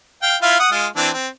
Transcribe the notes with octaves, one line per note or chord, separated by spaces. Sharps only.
F5 G5
E4 F4 F5
F#5 D#6
G#3 F4
E3 C4 D4
C4